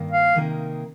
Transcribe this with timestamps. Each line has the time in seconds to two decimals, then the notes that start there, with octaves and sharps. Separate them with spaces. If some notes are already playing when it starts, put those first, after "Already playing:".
Already playing: G2 D#3 A#3
0.11 F5
0.35 C3 D#3 A#3 D#4 A#4